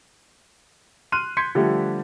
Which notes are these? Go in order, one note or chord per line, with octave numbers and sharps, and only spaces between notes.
C6 F6 F#6 D#7
C6 G6 G#6 B6 C#7
D3 F3 G3 A3 G4